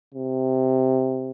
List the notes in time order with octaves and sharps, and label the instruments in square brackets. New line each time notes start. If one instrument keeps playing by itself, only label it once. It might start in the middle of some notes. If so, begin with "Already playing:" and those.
[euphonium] C3